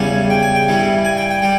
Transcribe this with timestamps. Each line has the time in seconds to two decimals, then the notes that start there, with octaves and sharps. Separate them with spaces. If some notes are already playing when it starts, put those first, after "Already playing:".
Already playing: E2 C#3 G3 G#5
0.30 G5
0.43 G#5
0.55 G5
0.68 G2 E3 G3
1.05 G#5
1.17 G5
1.31 G5
1.42 G3 G5